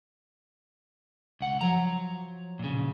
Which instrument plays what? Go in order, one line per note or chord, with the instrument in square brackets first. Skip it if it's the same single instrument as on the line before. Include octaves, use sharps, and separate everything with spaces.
[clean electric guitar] C#2 F#5
[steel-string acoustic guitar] F3 F#3 [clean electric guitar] C#5 A#5
[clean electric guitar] A#2 C#3